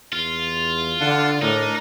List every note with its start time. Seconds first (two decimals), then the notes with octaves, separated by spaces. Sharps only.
0.13 E2 F4
1.01 D3 F5 F#5 A5
1.42 A2 D4 D#4 A#4